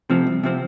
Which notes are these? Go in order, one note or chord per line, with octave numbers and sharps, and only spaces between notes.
C3 F3 C4
C2
C3 F3 C4